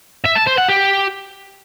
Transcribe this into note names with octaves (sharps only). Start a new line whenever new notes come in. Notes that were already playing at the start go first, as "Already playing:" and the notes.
E5
A5
C5
F#5
G4